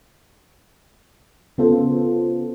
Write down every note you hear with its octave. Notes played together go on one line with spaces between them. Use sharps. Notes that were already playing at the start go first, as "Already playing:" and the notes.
C#3 B3 F4 A4 C5